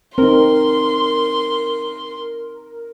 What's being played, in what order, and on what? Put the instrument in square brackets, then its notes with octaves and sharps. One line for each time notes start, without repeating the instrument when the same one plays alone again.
[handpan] C4 D#4 [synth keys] A#4 [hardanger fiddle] C6